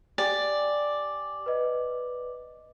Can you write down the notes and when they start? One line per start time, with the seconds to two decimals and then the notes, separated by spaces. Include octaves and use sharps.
0.18 G4 D5 G5 G#5
1.46 B4 D#5